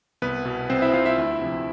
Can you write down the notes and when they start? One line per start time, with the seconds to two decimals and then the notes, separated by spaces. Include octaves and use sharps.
0.22 C2 B3 B4
0.45 B2
0.69 C2 C4 C5
0.82 E4 E5
0.94 B2 F4 F5
1.06 E4 E5
1.18 D2
1.41 C3 F3